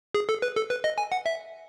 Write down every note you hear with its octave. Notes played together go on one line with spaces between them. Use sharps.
G#4
A4
B4
A4
B4
D#5
G#5
F#5
E5